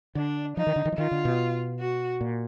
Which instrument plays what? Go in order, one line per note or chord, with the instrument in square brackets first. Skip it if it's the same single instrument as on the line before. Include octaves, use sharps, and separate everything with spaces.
[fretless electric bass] D3 [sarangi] D4
[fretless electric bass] F3 [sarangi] D#4
[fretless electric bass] D#3
D3
D#3
F3
[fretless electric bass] D#3 [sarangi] F4
[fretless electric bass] D3
B2
[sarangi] F#4
[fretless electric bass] A#2